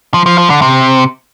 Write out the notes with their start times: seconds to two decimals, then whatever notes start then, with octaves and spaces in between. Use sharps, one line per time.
0.14 F3
0.26 F3
0.38 F3
0.50 D3
0.62 C3